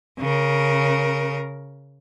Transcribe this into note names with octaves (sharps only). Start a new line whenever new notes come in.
C#3 A#4